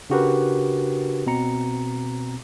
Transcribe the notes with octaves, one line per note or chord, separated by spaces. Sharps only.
C#3 D4 F#4 G4 A#4 B4
B2 C4 A#5 C#7